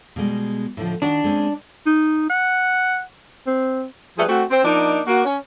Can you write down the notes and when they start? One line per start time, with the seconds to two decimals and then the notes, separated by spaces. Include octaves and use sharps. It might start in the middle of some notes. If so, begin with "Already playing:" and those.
0.16 B2 G3 G#3
0.77 A2 D3 F3
1.02 D#3 D4 F#4
1.24 G#3 C4 C#4
1.86 D#4
2.30 F#5
3.47 C4
4.17 F3 G3 A3 G#4 B4
4.28 A3 C4 F#4
4.51 C4
4.65 F3 A#3 D4 D#4
5.07 A#3 F#4
5.25 C#4